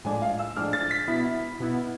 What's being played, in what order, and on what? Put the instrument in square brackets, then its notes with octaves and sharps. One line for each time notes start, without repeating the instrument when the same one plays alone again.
[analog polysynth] A2 F3 G#3 D4 [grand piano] G#5
[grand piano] F5
E6
[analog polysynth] A2 F3 G#3 D4 [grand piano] F6
[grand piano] A6
B6
[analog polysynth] B2 B3 E4
B2 B3 E4